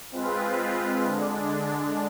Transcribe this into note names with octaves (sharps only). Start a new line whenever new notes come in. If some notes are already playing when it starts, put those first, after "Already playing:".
G#3 C4 F4 B4
D3 G#3 D4